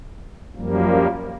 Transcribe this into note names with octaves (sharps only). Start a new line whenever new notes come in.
F#2 F3 G3 A#3